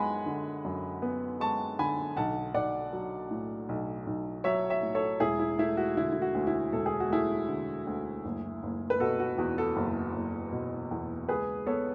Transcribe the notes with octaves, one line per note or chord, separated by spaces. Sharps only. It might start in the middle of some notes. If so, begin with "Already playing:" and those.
Already playing: F#2 G#3 B3 F#5 G#5 B5
D3
F#2
B3
G#3 A5 C#6
D3 G#5 B5
B1 F#5 A5
B1 D5 F#5
F#3
A2
B1
B1
F#3 C#5 E5
C#5 E5
A2
A4 C#5
E1 E4 G#4
E4
A3 E4
F#4
D3 E4
E4
F#4
D2
E4
E1 A4
G#4
F#4
A3 E4 G#4
D3
D2
F#1
F#1
B4
B2 F#4 A4
F#4
E2 F#4
F#4 A4
F#1
F#1
B2
E2
C#2 G#4 B4
B3 A4 C#5